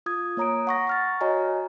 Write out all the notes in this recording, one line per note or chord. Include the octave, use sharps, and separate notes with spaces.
F4 D#6 G#6
A#3 C#5 A#5 D#6 D7
F#5 C#6 A#6
C#6 F6 A6
F#4 C#5 D#5 G#5 A#5